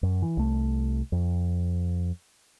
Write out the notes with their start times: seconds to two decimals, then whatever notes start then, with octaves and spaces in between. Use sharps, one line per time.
0.03 F#2
0.22 E3
0.37 C2 A3
1.12 F2